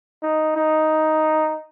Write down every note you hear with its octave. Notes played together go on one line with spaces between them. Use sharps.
D#4
D#4